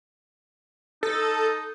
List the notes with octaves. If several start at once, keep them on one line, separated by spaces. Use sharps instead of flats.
D#4 A4